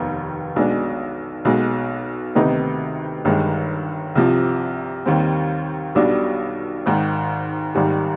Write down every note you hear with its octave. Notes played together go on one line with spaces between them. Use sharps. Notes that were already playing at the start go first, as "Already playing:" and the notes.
Already playing: F1 D#2 D#3 B3
B1 B2 G#3 D4
B1 B2 G#3
D2 C3 D#3 B3 D#4
G1 G2 D#3 G#3
C2 C3 F3
D#2 D#3 G3 C4
B1 B2 G3 D4
G#1 G#2 D#3
G#1 G#2 D#3 G3